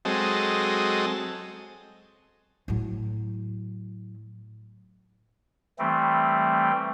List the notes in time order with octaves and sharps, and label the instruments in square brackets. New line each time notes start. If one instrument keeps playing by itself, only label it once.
[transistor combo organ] F#3 G#3 C4 A4 D#5
[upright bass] A2 F#3
[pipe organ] E3 G3 A3 C4